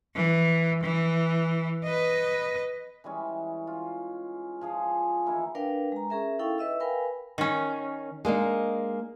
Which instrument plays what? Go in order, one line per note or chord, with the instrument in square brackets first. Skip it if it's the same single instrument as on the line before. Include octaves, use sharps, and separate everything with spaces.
[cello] E3
E3
B4 D#5
[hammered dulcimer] E3 G3 G#3 C#4
F4
F3 G#4 F5
D#3 E3 A#3 E4
[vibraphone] D4 A#4 B4 D5 F5 G5
G#3 A#5
C#4 G#4 A#4 E5
D#4 E4 A4 F5 G5 C#6
B4 D#5 E5 E6
A#4 B4 F5 G5 G#5 B5
[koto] D#3 C#4
[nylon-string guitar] G#3 A#3 D4 D#4